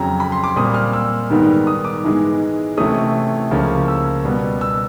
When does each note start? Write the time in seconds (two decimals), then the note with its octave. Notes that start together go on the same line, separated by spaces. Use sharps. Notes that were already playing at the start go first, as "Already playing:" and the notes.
Already playing: F2 C#3 F#3 A#5
0.20 B5
0.32 C6
0.44 D6
0.56 A#2 G3 C4 D#6
0.74 F6
0.93 E6
1.30 G#2 D#3 G3 B3
1.67 D#6
1.85 D6
2.04 G#2 E3 G#3 B3
2.77 C3 E3 A3 C#4 D#6
3.51 C#2 C#3 F3 A#3 C#4
3.88 E6
4.24 B2 G3 B3
4.61 E6